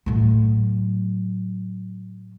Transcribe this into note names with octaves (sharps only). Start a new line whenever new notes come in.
A2 F#3